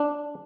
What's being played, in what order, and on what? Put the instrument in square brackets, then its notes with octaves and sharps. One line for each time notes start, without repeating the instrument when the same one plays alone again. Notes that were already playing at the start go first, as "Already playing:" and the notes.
Already playing: [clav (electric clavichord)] D4